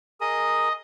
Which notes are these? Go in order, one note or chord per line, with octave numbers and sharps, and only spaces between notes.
G#4 A#4 D#5